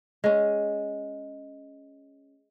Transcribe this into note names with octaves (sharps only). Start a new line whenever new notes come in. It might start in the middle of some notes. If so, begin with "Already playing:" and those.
G#3 C#4